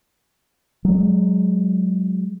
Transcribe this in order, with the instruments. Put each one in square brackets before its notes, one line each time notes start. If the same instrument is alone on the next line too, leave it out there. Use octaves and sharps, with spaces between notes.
[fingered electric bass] F#3 G#3